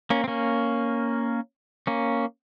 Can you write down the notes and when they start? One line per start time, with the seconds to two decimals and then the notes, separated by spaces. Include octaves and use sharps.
0.10 A#3 C#4
0.24 C4
0.28 A#3 C#4
1.87 A#3 C#4